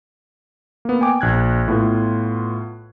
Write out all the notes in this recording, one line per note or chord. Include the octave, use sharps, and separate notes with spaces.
A#3 B3
G5 G#5 D6
A#1 F#6 G#6
A2 B3 F4